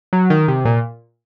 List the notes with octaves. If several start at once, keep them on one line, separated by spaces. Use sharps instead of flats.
F#3
D#3
C3
A#2